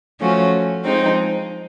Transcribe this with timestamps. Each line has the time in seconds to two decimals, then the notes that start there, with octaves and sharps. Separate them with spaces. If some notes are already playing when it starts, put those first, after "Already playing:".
0.20 F3 A3 C#4 F#4
0.85 F3 G#3 C4 D#4